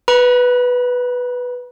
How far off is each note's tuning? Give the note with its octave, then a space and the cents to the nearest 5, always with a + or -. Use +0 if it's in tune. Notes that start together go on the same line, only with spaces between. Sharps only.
B4 +0 B5 -45